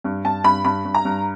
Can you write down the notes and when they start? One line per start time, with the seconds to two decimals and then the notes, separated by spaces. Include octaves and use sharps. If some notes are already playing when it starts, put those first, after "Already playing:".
0.04 G2
0.25 G2 A5
0.44 G2 B5
0.65 G2 B5
0.85 G2
0.94 A#5
1.05 G2